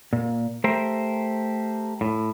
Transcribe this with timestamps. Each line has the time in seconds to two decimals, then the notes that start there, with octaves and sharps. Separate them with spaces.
0.13 A#2
0.64 A3 G4 A#4 C5
2.01 A2